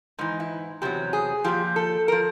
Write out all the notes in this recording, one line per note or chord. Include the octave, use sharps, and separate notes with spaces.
G#2 E3 D#4
E4
E2 C3 F#3 G4
G#4
A#2 F3 G4
A4
F3 A#4